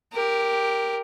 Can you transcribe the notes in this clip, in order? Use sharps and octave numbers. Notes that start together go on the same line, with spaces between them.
G4 A#4